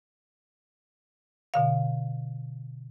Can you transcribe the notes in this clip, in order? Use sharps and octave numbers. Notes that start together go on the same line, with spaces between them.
B2 D3 F5